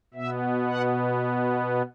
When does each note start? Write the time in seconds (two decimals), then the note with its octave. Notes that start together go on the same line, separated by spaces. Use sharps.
0.14 B2 B3 E5
0.66 F#5